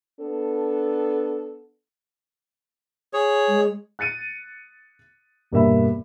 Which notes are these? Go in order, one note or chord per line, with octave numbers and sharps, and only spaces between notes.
B3 D4 A4
G#4 C#5
G#3
F#6 A6 C#7 D#7
E1 G2 A#3 E5 B5